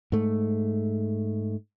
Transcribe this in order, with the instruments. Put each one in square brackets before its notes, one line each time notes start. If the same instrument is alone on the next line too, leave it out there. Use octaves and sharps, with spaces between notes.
[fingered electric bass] G#2 A3